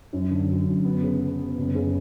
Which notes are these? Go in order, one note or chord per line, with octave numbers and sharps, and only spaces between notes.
F#2
D3
F#3
F#2
B3
C#3
B3
B3
F#1
C#3